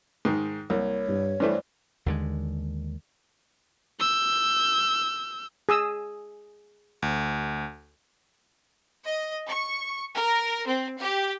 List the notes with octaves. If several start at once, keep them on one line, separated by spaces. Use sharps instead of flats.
G#2 D#3
C2 A#3 C#5
G2
G2 E3 A3 C5 D5
D#2 D3 G#3
E6 G6
G#4 D#6 E6
D2
D#5
C#6
A#4
C4
G4